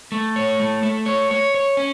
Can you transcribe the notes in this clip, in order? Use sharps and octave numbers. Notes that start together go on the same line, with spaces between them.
A3
C#5
A3
A3
C#5
C#5
C#5
C#4